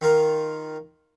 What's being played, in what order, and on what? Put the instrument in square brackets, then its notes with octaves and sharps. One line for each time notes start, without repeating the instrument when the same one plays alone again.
[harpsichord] D#3 F4 A#4